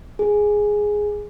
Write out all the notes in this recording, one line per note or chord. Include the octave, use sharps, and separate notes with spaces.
G#4